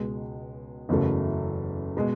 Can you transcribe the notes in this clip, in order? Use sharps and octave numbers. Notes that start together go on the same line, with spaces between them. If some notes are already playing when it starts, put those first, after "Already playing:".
Already playing: C#2 B2 G#3
F#1 E2 C#3 F#3 A3
B2 G#3